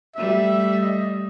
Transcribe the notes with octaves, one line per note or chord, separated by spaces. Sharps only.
G3 A3 E5
D#5